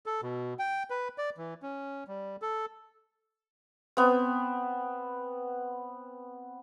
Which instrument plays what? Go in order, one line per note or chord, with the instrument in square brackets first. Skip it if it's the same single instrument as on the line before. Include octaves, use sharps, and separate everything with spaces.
[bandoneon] A4
B2
G5
B4
D5
E3
C#4
G3
A4
[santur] B3 C4